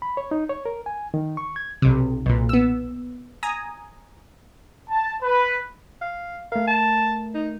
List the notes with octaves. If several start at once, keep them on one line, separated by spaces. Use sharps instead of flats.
B5
C#5
D#4
C#5
A#4
G#5
D#3
C#6
G#6
B1 C3
B1 A#2
B3 E6
G#5 A#5 D#6
A5
B4
F5
A3 A#4 F5
A5
D#4